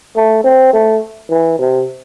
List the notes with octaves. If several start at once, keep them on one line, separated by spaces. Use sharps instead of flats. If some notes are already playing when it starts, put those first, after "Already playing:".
A3
C4
A3
E3
C3